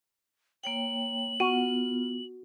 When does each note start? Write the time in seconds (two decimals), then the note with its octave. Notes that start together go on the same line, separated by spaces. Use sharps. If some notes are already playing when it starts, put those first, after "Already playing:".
0.64 A#3 C#5 G5 F#7
1.40 B3 F4 F#4